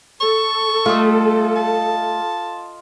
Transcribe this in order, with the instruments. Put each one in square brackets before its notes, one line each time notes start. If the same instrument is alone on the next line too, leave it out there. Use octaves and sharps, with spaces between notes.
[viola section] A4 [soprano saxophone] C#6
[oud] G3 A3 [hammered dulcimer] F4 D#5
[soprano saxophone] A5